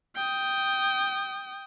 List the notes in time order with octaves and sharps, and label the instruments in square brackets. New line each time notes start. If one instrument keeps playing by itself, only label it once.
[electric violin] G5 D#6